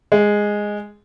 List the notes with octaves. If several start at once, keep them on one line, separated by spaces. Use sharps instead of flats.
G#3